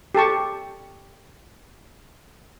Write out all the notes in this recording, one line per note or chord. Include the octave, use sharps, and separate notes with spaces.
G4 A4 A5 C#6